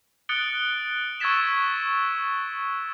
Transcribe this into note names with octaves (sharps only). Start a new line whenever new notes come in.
D#6 F#6 A6 C#7 D7 G7
C#6 E6 G#6 A6 B6 E7